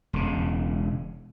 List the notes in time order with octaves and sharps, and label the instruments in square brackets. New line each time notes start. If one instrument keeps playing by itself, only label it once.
[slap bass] E1 C#3